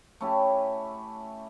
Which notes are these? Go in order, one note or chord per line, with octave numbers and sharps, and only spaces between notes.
A3 C#4 E4 G4